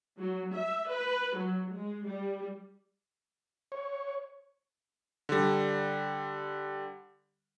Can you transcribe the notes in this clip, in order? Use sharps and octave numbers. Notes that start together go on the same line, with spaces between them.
F#3
E5
B4
F#3
G#3
G3
C#5
D3 G3